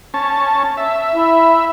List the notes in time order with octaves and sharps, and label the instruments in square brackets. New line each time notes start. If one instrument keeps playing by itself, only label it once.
[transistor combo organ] C#4 A5
E5
[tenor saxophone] E4